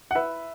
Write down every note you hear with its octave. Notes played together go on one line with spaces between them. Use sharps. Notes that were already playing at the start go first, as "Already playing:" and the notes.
F#5
E4 B4 E5